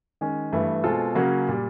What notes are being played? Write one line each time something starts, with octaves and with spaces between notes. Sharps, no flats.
D#3 G#3 C#4
G2 E3 A3
B2 G#3 C4 F4 A4
C#3 F#3 A#3 C#4 F#4
A#2 G3